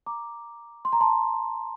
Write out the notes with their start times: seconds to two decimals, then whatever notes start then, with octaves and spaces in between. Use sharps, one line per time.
0.07 A#5 D6
0.85 C6
0.93 A#5
1.01 A5 C6